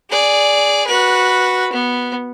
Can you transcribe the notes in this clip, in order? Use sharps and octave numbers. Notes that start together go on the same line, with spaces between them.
G#4 D5
F#4 B4
B3